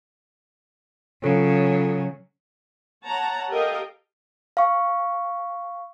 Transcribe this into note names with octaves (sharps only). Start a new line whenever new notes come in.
C#3 F#3 F4 A4
C#5 F#5 A5 A#5
G4 A4 A#4 D#5 F5 G5
F5 C#6